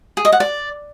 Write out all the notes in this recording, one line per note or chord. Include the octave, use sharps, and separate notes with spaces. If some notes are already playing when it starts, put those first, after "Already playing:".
G#4
D#5
F#5
D5